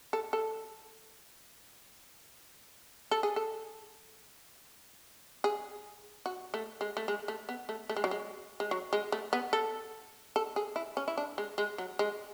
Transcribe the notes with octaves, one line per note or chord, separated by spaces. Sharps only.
A4
A4
A4
G#4
A4
G#4
F#4
A3
G#3
A3
G#3
A3
B3
A3
A3
G#3
F#3
G#3
G#3
F#3
G#3
A3
B3
A4
A4
G#4
E4
C#4
E4
D4
G#3
G#3
F#3
G#3